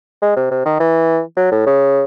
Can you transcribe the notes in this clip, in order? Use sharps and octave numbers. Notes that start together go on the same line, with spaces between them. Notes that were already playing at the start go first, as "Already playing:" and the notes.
G#3
C3
C3
D#3
E3
F#3
A2
C#3